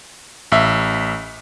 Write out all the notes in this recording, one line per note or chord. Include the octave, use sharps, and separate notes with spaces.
A1 E5